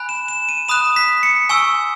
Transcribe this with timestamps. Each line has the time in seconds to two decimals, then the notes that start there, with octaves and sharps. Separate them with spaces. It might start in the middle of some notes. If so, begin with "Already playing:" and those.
Already playing: G#5 B5 F#6
0.09 E7
0.28 E7
0.49 D#7
0.69 B5 D#6 F#6 E7
0.96 B6
1.23 C#7
1.50 G#5 C#6 E6